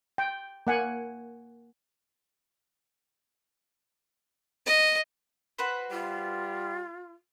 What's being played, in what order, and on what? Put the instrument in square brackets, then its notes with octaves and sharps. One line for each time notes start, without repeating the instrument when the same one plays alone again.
[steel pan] G5
A#3 F#5 G#5
[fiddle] D#5
[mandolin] F#4 B4 C5
[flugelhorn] G3 [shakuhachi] F4